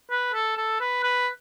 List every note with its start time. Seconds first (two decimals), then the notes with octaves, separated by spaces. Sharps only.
0.10 B4
0.34 A4
0.57 A4
0.81 B4
1.03 B4